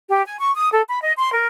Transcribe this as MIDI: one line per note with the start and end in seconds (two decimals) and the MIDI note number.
0.08 0.25 67
0.26 0.36 80
0.40 0.54 85
0.55 0.70 87
0.72 0.82 69
0.89 1.01 83
1.02 1.13 75
1.18 1.32 84
1.34 1.47 70